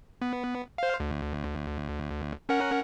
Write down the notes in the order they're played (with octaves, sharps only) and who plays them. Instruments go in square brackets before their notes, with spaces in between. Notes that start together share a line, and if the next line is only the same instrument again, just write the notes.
[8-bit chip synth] B3
C5 F5
D2
C#4 A#4 F#5